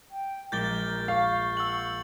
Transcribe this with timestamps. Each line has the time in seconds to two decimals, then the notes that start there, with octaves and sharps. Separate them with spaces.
0.11 G5
0.52 A#1 G#3 A#4 D6 G6 A6 G7
1.08 F5 C#6
1.57 F#5 E6 F#7